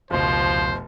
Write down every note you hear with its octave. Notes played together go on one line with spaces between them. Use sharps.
F1 C#2 B2 F3 C5